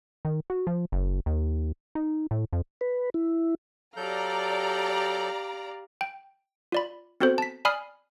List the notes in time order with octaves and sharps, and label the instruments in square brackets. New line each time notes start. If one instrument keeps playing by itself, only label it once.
[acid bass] D#3
F#4
F3
F#1
D#2
D#4
A2
F2
[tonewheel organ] B4
E4
[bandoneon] F#3 A4 G6 [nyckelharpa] G4 F5 [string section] D5 A#5
[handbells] G5
F4 D5 B5
B3 C4 F#4 A4 C5
A5 B6
D5 G#5 B5 D#6 F6 C7